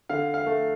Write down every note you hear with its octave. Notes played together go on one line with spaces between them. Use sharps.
D3 F5
F5
A3